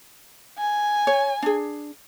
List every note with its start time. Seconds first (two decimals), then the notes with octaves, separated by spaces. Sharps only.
0.59 G#5
1.07 C#5
1.42 D4 G#4